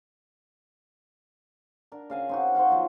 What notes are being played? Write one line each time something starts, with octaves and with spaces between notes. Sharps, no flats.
D4 A#4
C#3 F5 G#5
C4 D#4 F#4
C5 C#5 F5 F#5
B2 F3 F#3